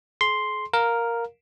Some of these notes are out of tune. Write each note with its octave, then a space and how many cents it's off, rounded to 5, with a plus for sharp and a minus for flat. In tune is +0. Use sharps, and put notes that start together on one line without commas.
G#4 +45 C6 +0
A#4 +0 F5 +15